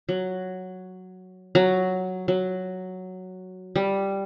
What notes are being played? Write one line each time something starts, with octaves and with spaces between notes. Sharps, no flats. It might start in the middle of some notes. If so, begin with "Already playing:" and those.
F#3
F#3
F#3
G3